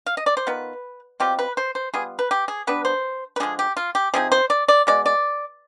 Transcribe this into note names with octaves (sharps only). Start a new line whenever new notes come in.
F5
D#5
D5
C5
D#3 B3 F4 B4
B2 G3 C4 F4 G4
B4
C5
C5
G3 B3 F4 G#4
B4
G4
G#4
G3 B3 D4 B4
C5
B4
D3 F3 G#3 G#4
G4
F4
G4
C3 F3 C4 D#4 G#4
C5
D5
D5
B2 G#3 D5
D5